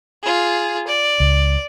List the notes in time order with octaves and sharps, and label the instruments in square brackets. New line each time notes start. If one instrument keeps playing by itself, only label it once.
[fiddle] F4 G#4
D5
[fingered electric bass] C#2